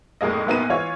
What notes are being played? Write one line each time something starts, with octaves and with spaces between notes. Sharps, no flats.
F1 A2 G#3 A#3 D#5
A#1 A#2 A#3 B3 D#4 D#7
E3 F4 C#5